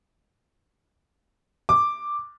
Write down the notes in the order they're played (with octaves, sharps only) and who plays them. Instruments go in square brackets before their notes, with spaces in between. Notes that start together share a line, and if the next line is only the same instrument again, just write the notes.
[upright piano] D6